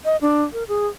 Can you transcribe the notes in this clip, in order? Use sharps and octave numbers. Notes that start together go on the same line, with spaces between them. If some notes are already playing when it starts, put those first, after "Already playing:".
D#5
D4
A#4
G#4